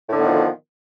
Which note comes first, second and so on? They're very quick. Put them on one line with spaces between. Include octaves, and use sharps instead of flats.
A2 D3 B3 D#3 F3